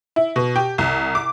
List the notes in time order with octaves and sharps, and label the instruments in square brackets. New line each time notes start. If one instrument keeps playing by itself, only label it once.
[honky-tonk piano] E4
B2
G4
C2
D6